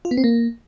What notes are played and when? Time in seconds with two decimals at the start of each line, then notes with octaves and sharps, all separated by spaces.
0.05 F4
0.11 B3
0.17 C4
0.24 A#3